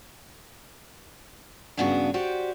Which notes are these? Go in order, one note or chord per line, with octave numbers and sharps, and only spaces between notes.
G2 C#3 B3 D4 E4 F#4
F#4 G4 C5 D5